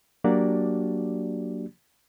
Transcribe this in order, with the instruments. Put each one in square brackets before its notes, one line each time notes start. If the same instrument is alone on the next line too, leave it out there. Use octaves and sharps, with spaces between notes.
[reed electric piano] F#3 A#3 D4 F#4 G4 D5